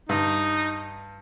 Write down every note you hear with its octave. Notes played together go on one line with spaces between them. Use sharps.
G2 D#4